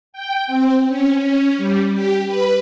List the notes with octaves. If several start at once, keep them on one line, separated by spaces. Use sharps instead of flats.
G5
C4
C#4
C#4
G3
G4
B4